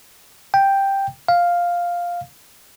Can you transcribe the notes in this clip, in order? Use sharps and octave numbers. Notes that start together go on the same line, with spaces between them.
G5
F5